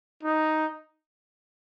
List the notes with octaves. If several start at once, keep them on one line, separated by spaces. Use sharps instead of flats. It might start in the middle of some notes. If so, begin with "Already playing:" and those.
D#4